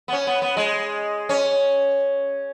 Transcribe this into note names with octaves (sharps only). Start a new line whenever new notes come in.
B3
C#4
B3
B3
G#3
C#4